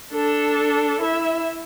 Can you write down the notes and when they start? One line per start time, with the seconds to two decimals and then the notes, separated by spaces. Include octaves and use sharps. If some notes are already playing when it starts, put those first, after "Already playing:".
0.13 D4 A4
1.01 E4 E5